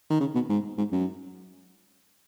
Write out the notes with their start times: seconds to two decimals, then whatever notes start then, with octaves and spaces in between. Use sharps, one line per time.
0.10 D#3
0.20 C#3
0.35 B2
0.49 G#2
0.78 G#2
0.92 F#2